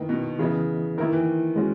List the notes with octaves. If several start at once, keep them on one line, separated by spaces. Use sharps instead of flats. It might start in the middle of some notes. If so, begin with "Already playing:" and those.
Already playing: D#3 A#3 E4 B4 D#5
B2
C#3 E3 B3 E4 B4 D#5
D#3 A#3 E4 A#4
E3
G#3 C#4 F#4